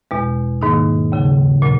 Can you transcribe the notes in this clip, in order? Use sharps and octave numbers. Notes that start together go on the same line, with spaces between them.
E2 B2 G#3
G#2 D#3 A#3 D#4
D#2 C#3 F#3
A#2 F#3